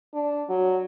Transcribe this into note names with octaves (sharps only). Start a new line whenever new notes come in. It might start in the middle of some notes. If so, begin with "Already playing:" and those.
D4
F#3